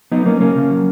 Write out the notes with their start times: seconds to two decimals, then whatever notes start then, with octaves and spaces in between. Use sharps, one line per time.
0.12 F#3 B3 D#4
0.26 F#3 A#3 C#4
0.41 C#3 A#3 C#4
0.56 C#3
0.70 F#3